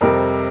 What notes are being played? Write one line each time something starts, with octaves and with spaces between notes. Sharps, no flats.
F2 C3 G3 A#4